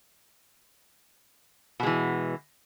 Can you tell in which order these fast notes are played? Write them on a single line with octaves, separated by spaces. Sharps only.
B2 G#3 E3